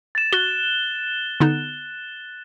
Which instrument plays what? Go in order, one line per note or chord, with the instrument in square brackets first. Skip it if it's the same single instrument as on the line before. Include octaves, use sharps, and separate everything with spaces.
[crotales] A6 E7
[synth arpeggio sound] F#4 [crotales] F#6 G7
[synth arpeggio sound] D3 B3 D#4